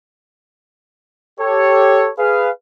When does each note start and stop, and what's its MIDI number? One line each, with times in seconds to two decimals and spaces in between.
1.40 2.10 67
1.40 2.10 69
1.40 2.10 73
2.19 2.49 68
2.19 2.49 71
2.19 2.49 77